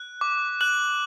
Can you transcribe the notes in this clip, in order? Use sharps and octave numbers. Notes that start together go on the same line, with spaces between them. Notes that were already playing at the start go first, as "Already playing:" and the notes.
Already playing: F#6
D6
F#6 F#7